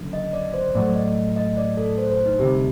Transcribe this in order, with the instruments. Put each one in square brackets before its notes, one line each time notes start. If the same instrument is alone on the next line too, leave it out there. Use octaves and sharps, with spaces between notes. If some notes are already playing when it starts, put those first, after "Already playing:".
Already playing: [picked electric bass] F#1 F#2 D3
[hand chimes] D#5
D5
C5
[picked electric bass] A2 F#3 A3 [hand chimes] D5
[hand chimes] D#5
D#5
D5
A4
C5
C5
D#4
[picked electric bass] D2 C3 G3 [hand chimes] G4